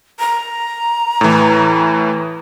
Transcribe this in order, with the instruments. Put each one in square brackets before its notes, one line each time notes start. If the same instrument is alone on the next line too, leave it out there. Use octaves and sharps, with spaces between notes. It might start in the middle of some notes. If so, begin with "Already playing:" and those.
[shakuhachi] A#5
[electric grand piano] A2 E3